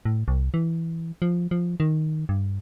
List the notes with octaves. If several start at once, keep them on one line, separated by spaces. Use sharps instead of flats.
A2
C2
E3
F3
F3
D#3
G2